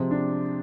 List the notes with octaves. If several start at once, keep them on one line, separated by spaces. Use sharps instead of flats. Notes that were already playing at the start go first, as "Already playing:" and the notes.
Already playing: C3 F3 G#3 C4
D4